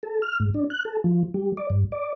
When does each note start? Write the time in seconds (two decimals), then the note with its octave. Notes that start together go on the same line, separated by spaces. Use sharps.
0.03 A4
0.22 F6
0.40 G#2
0.54 D4
0.70 F#6
0.85 A4
1.04 F3
1.34 G3
1.57 D5
1.70 G2
1.92 D5